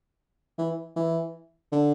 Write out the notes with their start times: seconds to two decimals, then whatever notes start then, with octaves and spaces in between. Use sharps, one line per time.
0.58 E3
0.96 E3
1.72 D3